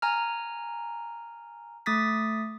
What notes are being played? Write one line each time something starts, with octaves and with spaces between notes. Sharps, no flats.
G#5 A#5 F6
A3 D#6 A6 B6